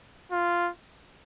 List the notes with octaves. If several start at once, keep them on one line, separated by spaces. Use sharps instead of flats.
F4